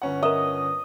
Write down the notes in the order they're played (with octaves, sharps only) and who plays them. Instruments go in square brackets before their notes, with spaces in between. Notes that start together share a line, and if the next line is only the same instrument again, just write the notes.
[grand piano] G1 C#4 F#5
[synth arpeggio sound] A#4 E5 [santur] D#5